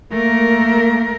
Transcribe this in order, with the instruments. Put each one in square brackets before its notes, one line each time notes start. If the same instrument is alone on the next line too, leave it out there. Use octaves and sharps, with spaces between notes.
[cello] A3 A#4 [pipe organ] A#3